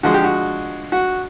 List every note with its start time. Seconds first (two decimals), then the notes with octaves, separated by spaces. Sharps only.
0.03 D3 F3 G#3 F#4
0.14 G4
0.24 F#4
0.92 F#4